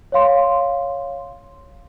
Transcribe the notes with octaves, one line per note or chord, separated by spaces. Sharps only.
C#5 F5 C6